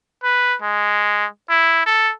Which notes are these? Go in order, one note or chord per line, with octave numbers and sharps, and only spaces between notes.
B4
G#3
E4
A4